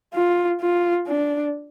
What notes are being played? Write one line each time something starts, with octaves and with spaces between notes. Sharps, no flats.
F4
F4
D4